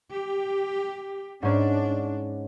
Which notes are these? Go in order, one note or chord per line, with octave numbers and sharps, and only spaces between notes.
G4
G#2 C#4 D4